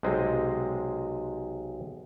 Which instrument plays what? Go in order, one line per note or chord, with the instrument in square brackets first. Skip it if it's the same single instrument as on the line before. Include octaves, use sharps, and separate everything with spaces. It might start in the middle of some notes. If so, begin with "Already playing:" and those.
[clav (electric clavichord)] B1 C3 G#3 C4 D#5